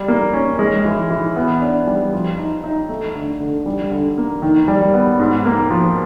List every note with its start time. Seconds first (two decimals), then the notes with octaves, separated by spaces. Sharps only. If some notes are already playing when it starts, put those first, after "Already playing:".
Already playing: G3
0.08 A#3
0.33 C#4
0.59 G#3
0.85 E3
1.10 E3
1.36 B3
1.61 D4
1.87 G3
2.13 F3
2.38 D#4
2.64 D#4
2.89 A3
3.15 D3
3.40 D3
3.66 G3
3.91 D3
4.18 A#3
4.42 D#3
4.68 G3
4.94 B3
5.19 G#2
5.45 A#3
5.70 F3